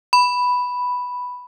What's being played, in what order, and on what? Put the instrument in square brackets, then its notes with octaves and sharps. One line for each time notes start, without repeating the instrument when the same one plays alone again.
[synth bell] B5